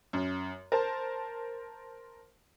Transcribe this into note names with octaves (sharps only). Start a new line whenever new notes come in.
F#2
A#4 C5 A5